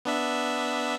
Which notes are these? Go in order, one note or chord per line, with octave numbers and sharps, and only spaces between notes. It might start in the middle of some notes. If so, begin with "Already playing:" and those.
B3 D4 E5